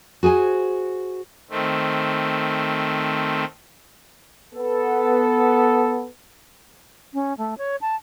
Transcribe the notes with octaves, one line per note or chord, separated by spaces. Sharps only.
F#4 G#4 C5 G#5
D#3 A3 C4
B3 A4
C#4
A3
C#5
A5